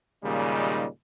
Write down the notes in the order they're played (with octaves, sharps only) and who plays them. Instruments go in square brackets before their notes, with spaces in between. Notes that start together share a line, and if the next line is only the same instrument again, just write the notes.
[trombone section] D#2 A#2 C#3 G3 G#3 D#4